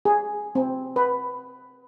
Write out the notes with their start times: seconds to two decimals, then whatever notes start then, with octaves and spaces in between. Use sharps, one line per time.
0.05 G#4
0.55 C4
0.96 B4